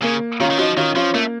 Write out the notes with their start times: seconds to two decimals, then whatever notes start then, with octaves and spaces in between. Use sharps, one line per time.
0.02 C#3 A#3
0.40 D#3 C#4 F4
0.50 D#3
0.58 F3 D#4 F#4
0.76 D#3 C#4 F4
0.96 F3 C#4 F4
1.14 A3 A#3